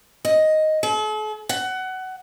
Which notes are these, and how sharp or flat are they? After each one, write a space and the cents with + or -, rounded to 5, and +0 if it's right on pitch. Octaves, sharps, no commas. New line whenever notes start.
D#5 +5
A4 -45
F#5 +20